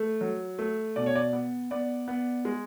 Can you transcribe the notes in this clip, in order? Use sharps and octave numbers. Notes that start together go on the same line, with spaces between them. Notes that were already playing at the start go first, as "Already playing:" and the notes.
Already playing: A3
F#3
A3
B2 D5
C#5
D5
B3
B3 D5
B3
G#3